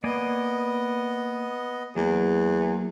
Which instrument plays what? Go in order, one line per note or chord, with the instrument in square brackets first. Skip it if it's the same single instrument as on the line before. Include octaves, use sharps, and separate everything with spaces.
[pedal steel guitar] A#3 D5 G#5 [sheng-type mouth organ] B3 D#5
[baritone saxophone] E2 [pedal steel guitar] F#3 A#3